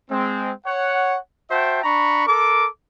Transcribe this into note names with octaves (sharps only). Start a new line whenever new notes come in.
G#3 C4
C#5 F#5
F#4 C5 E5 G5 A5
D4 A#5 B5 C#6
A4 A#4 D6